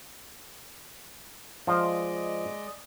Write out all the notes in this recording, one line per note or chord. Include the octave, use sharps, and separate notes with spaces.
F3 G#3 D5 D#5